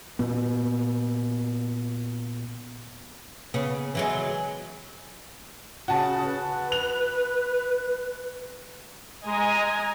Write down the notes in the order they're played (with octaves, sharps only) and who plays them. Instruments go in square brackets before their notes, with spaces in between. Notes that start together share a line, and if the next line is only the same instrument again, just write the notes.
[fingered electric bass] A#2 B3
[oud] C#3 B3
E3 F#3 G#3
[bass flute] C#3 [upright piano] F#4 A5
[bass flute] B4
[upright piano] F7
[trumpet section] G#3 [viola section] D#5 G#5 A#5